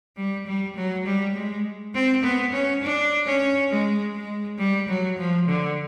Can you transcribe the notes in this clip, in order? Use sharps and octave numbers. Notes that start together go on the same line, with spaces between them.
G3
G3
F#3
G3
G#3
C4
B3
C#4
D4
C#4
G#3
G#3
G3
F#3
F3
D3